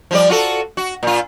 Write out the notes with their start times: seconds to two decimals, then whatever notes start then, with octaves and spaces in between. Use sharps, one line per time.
0.11 F3 G3 D5
0.30 F4 F#4 A4
0.77 F#4
1.03 A#2 F4